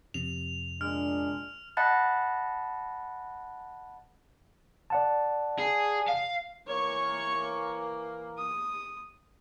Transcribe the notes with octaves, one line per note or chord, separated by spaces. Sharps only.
F2 C3 F7
A#2 G#3 D4 F6
D#5 F#5 A5 B5 F#6 A6
D5 F#5 A5
G#4
F5
E3 A#3 C#5 C#6
D#6